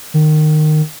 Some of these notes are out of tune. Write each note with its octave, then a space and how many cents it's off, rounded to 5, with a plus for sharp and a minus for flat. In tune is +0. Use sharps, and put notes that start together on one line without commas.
D#3 -20